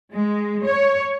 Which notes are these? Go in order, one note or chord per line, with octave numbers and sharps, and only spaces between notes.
G#3
C#5